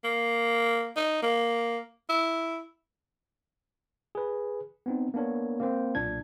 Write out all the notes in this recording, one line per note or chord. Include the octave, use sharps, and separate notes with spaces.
A#3
D#4
A#3
E4
G#4 B4
B3 C4 D#4
A#3 B3 D4 A#4 C#5
A#3 C4 C5 G5
B1 A#2 D4 G#6